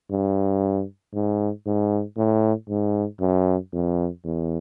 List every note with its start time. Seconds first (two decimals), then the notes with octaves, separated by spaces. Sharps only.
0.11 G2
1.14 G#2
1.66 G#2
2.17 A2
2.69 G#2
3.20 F#2
3.73 F2
4.24 E2